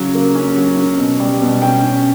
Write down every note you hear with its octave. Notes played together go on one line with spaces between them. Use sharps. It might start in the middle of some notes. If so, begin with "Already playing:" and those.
Already playing: C#3 F#3
A#3
C#4
F#3
C#4
B2
G3
B2
C#4 G5
C#4